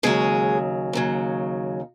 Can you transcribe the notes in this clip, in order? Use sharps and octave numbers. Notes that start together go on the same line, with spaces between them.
D#2 C#3 F#3 G#3 G#4
D#2 C#3 F#3